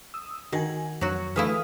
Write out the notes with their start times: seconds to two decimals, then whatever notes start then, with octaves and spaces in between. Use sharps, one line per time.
0.14 D#6 E6
0.52 D#3 F#4 G#5
1.01 F2 F#3 F#4
1.36 E3 A3 E4 F5 D#6 F6